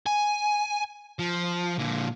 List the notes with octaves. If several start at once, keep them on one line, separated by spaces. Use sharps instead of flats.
G#5
F3
A#2 D3